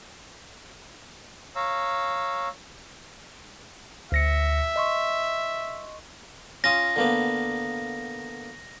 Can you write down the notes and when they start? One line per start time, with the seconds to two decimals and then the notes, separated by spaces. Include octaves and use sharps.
1.56 C#5 F5 A#5 E6
4.12 D2 E5 A#6 C#7
4.76 D#5 C6 C#6
6.64 C#4 F4 D#6 A#6
6.96 D3 A#3 B3